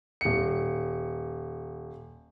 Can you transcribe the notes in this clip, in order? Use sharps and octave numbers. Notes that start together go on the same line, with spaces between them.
D#1 C#7